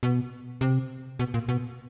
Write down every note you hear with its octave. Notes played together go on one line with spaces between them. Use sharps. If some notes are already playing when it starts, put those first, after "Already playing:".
B2
C3
B2
A#2
B2